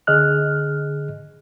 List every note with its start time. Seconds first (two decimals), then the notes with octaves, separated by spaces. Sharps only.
0.07 D3 G#4 D#5 F6 F#6